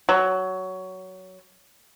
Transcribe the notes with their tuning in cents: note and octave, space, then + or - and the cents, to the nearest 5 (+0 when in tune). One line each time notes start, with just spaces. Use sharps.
F#3 +15